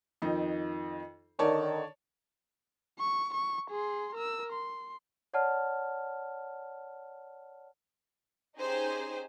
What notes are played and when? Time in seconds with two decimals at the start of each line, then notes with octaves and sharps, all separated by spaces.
0.22 F2 D#3 D#4
1.39 D3 D#3 C#5 D5 A5
2.99 C#6
3.34 C#6
3.71 G#4 C6
4.16 A#4 E6
4.53 C6
5.34 C#5 D5 F#5 A5 F6
8.59 C#4 D#4 G4 G#4 C5